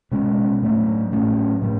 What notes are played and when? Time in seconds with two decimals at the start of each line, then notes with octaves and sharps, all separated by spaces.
0.12 B2 G#3 C#4
0.62 A2 F#3 A3
1.12 A2 F#3 A3 C#4
1.62 A2 F#3